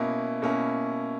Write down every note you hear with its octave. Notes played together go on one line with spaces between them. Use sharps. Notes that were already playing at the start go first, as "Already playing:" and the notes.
Already playing: B2 A#3 C#4 E4
B2 A#3 C#4 E4